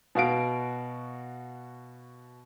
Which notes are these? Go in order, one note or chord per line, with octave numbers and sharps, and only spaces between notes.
B2 F#4 F5 D7